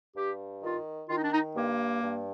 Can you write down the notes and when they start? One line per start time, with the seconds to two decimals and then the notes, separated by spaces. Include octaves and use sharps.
0.15 G2 G4
0.62 D#3 F4
1.09 D#3 F4
1.16 D#4
1.24 D4
1.31 D#4
1.56 G2 A#3
2.03 G2